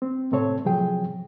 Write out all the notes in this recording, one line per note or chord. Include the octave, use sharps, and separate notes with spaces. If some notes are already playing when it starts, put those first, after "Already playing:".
C4
A2 C3 A3 C4 A4 C#5
C3 F3 F#3 G#4 G5